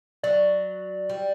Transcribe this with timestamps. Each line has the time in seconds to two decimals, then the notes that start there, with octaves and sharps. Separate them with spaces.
0.24 F#3 D5
1.10 G3